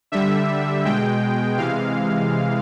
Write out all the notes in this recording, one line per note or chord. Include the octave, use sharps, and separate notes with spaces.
D3 G3 E5
B2 G#3 G5
C3 E3 G#3 F5